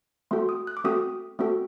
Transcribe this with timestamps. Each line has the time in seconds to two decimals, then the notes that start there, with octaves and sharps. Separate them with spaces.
0.31 A3 C4 F#4 A4 C6
0.49 D#6
0.67 F#6
0.77 D6
0.84 A3 C4 F#4 A4 D#6
1.39 A3 C4 F#4 A4